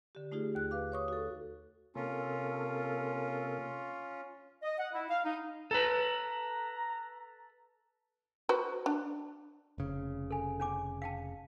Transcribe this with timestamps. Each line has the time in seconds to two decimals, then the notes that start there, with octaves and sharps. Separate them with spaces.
0.15 D3 G4
0.32 A3 D#4 F4 G4 G#4
0.55 D#2 F#6
0.71 B4 F5 D6
0.92 C#5 C#6 D#6
1.08 F#4 A4
1.95 C3 A#3 C#4 F4 A4
4.63 D#5
4.78 F#5
4.92 E4
5.09 F5
5.24 D#4
5.71 A4 B4 A#5
8.49 F#4 B4 C5
8.86 D4
9.78 F1 C#3
10.30 A4 G#5
10.60 C#4 G#5 D6
11.02 F5 G5 A5